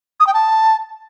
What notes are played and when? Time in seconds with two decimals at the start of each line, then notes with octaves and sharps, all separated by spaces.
0.20 D#6
0.27 G5
0.34 A5